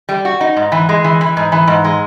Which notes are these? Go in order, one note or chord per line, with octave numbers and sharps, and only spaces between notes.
G3
F#4
D#4
G#2
E3
G#3
E3
E3
G#2
E3
G#2
G#3